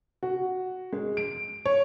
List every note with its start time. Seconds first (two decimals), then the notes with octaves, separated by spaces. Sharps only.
0.23 F#4
0.93 G#3
1.17 D7
1.66 C#5